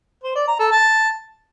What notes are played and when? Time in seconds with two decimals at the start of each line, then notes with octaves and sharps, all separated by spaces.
0.23 C5
0.35 D5
0.47 A#5
0.59 A4
0.71 A5